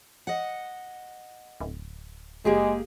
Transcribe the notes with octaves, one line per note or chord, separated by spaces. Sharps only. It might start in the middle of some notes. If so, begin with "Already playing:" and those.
D#5 F#5
D1
F#1 G#3 A#3 G4 G#4